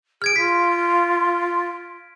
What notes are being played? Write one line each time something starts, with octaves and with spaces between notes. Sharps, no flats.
G#4 F6 G#6 D7
F4 B6